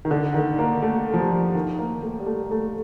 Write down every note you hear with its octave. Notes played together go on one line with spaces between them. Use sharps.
D#3
D3
D#3
A#3
A3
F3
G3
D#3
A#3
A3
G3
A3
A3